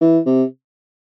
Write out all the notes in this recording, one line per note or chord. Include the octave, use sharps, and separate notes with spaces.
E3
C3